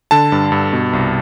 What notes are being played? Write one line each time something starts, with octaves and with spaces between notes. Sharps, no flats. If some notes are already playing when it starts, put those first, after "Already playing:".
D3 A5
G2
G2
B2
C2